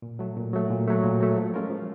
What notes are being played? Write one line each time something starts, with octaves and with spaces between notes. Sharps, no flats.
A#2
F#3 A3
A#2
F#3 A3
A#2
F#3 A3
A#2
F#3 A3
F3
G#3 C#4 F4 A#4
F3